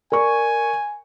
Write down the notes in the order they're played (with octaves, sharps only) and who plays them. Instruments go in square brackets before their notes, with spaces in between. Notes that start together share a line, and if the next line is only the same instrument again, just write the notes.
[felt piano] A#4 D5 C#6 [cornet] G#5